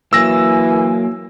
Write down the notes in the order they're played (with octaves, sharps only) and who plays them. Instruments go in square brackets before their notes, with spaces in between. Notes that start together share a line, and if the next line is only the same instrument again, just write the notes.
[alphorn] E3 [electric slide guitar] F#3 A#3 [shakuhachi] G#5 [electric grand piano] E6 A#6